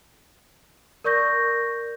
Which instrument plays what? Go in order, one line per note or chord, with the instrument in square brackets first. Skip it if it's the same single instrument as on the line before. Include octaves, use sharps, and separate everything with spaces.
[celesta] A#4 D5 C#6 G6 A#6